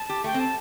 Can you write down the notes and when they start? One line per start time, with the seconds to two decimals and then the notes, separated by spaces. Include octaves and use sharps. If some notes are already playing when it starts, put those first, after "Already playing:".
Already playing: A5
0.09 G4
0.24 A3 G5
0.34 C4
0.40 A5